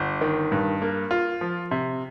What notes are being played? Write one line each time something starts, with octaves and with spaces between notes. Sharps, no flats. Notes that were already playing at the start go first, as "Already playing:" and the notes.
Already playing: G1
D#3
G2
A#3
F4
F3
C3